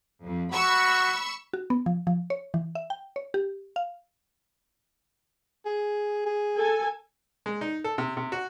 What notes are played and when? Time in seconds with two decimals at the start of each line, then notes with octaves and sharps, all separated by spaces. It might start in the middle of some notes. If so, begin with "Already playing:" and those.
0.23 F2
0.52 F#4 B5 C#6 E6
1.53 F#4
1.70 B3
1.86 F3
2.07 F3
2.30 C#5
2.54 E3
2.75 E5
2.90 G5
3.16 C#5
3.34 G4
3.76 F5
5.66 G#4
6.26 G#4
6.58 A4 G#5
7.46 G#3
7.61 D#4
7.84 A4
7.98 C3
8.17 C3
8.32 F#4